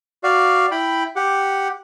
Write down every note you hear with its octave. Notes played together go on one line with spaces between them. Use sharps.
F#4 D5 F5
E4 G5 B5
G4 F#5